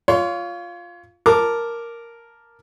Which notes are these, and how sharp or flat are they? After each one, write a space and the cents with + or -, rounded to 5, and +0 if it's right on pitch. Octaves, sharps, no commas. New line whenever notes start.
F4 +0 C#5 +30 C6 +0
A#4 +0 A5 +0 D6 +5